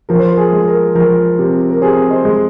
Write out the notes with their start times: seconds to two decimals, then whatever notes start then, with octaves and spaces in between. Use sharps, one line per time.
0.09 F3 A#4
0.19 C5
0.28 A#4
0.38 G#4
0.53 G#3
0.68 A#4
0.95 F3 A#4
1.39 C3
1.70 A#4
1.82 C3 G#4 C5
2.10 C5 D#5
2.25 G#3